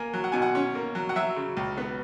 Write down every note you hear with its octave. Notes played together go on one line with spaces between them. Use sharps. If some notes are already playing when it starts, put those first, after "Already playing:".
Already playing: A#3 G#5
F#3
F#5
B2 G#5
F#5
C#4
A#3
F#3
F#5
F#3 E5
C#3
C#2
B3